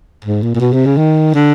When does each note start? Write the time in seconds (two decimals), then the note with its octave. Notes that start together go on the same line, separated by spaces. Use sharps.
0.24 G#2
0.43 A#2
0.55 A#2
0.60 B2
0.73 C3
0.86 C#3
0.97 D#3
1.34 D3